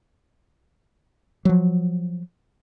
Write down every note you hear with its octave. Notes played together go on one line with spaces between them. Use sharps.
F3 F#3